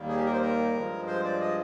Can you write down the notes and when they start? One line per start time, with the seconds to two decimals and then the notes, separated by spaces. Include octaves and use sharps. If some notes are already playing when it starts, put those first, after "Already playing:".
Already playing: D#2 D#3 G3 A#3
0.08 G#4
0.16 G4
0.25 A#4
0.32 C5
0.41 A#4
0.74 G2 F3 G#3
1.07 C5
1.24 D5
1.41 D#5